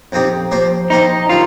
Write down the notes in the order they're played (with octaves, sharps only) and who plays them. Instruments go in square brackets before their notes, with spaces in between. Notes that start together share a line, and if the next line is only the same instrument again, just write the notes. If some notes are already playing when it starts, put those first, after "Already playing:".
[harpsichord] F2 F3 C4 D#4 G4
F3 A#3 G4 C5
[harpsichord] F3 A#3 G4 C5 [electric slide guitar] D#4
[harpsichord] D#3 G3 [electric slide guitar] F4